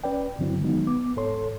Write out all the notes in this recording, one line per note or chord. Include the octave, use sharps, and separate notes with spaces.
C#4 B4 D5 G5
G2 D3 F#3 C4 E4
D#3 F#3 G#3 B3 D#4
B3 D6
G#2 A4 C#5 C6